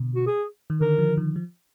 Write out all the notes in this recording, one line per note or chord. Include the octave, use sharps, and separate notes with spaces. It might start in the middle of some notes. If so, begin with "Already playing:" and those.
Already playing: B2 D3
F#4
G#4
D#3
D3 A#4
F3
D#3
F3